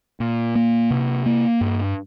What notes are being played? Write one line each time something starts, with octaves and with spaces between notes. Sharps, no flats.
A#2
A#3
C3
A#3
G2